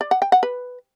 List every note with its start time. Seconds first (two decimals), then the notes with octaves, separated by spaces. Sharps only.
0.01 D5
0.11 F#5
0.22 G5
0.32 F#5
0.43 B4